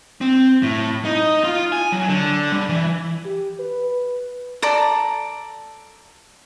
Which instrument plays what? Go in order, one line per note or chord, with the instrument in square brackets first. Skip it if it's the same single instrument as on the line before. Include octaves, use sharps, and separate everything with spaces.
[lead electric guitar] C4
A2
D#4
F4
G#5
F#3
D3
G3
E3
[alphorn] G4
B4
[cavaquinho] A4 D5 A5 A#5